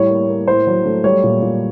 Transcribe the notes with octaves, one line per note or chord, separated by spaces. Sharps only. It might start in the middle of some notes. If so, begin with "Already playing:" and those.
Already playing: A2 G3 C#5
A#3
A#3
A2 C5
F#3
A3
G3 C#5
A#2
A#2